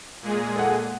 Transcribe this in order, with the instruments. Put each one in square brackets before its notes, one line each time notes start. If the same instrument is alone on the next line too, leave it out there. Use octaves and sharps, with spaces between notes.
[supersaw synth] A#2 G#3 G#4
[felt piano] A4 F#5